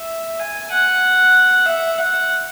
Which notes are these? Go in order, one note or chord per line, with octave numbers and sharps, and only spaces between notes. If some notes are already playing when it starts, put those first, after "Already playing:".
Already playing: E5
G#5
F#5
E5
F#5